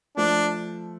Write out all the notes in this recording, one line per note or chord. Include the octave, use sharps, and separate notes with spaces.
F3 A3 D4